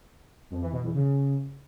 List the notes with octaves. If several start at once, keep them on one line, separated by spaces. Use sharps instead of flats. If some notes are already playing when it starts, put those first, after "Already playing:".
F2
E3
B2
E2
C#3